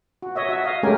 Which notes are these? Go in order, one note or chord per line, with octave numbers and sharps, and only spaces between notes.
F#4
C#5 D#5 E5
F#4 E5
D#5 F5
G#3 A3 C#4 G4 A#4 G#5